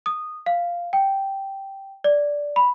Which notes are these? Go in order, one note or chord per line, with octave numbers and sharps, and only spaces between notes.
D#6
F5
G5
D5
B5